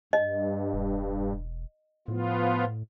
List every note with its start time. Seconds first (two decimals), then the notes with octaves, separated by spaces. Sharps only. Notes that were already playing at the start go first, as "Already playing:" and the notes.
0.13 G2 D#5
0.73 E1
2.08 A2 F3 B3 F4